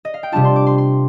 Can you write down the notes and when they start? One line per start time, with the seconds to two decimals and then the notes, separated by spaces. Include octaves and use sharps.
0.05 D#5
0.14 F5
0.23 G5
0.32 C3 G3 D4 F4 A5
0.45 C6
0.56 D6
0.67 C6
0.78 C6